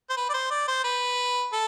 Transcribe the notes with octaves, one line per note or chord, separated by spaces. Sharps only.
C5
B4
D5
C5
D5
C5
B4
A4